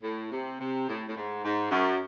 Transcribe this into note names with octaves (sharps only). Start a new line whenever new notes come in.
A2
C3
C3
A2
A2
G#2
G#2
F#2